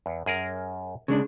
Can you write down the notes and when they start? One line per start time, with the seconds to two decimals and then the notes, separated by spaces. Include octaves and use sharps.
0.06 E2
0.26 F#2 G#4 A#4
1.08 C#3 G#3 D4